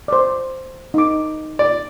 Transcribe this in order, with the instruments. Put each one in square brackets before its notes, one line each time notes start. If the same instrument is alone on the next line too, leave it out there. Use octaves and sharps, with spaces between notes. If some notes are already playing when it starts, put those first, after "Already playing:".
[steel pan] C5 D5
D#4 D6
[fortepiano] D5